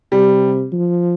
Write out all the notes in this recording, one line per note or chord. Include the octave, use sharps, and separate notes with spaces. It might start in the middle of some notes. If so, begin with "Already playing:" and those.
C3 G3
F3